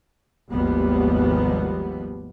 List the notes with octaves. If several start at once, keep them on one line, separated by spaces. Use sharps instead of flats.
G#1 D#2 F3 G3 B3